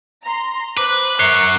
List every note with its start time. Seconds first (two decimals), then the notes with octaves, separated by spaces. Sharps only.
0.22 A#5 C6
0.77 B4 C5 D6 F#6
1.19 F#2 A#4 C#5 E5 F#6 C7 G7